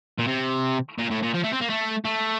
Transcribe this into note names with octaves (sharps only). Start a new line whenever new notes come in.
A#2
C3
A#2
A2
A#2
F3
A3
C4
A#3
A3
A3